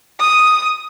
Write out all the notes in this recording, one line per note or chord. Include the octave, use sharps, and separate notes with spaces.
D#6